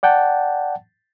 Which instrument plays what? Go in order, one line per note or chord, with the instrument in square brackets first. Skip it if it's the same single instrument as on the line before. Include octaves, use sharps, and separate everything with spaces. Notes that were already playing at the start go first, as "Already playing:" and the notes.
[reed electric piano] D5 F#5 G5 A5